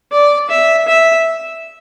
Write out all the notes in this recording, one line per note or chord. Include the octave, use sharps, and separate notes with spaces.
D5
E5
E5